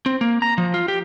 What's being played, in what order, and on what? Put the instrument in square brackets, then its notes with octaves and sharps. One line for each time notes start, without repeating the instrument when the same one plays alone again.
[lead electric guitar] C4
A#3
A#5
F3
F4
G4